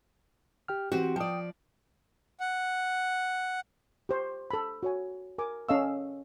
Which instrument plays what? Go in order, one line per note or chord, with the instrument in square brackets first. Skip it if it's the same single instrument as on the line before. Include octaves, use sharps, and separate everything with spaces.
[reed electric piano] G4 G5 F6
[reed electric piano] E3 G4 [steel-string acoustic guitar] C4 F#4
[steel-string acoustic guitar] F3 D5 [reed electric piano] G5 D#6
[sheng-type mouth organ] F#5
[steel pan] G4 C5 C#6
A4 B5
F#4 C#5 G#5
A#4 G#5 D6
C#4 A4 D#5 F5 C#6 E6